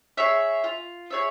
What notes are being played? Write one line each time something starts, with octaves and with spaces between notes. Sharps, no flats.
G#4 C#5 E5
F4
G#4 C#5 E5